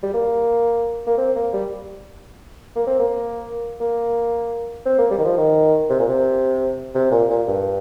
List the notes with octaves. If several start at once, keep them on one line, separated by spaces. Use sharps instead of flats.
G3
A#3
A#3
C4
A#3
G3
A#3
C4
A#3
A#3
C4
A#3
G3
D#3
F3
D#3
C3
A#2
C3
C3
A#2
A#2
G2